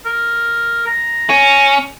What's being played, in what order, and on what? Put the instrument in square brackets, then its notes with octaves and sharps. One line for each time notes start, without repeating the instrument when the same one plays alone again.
[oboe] A#4
A#5
[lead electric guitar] C#4